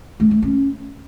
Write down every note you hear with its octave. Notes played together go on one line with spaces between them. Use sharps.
A3
A3
C#4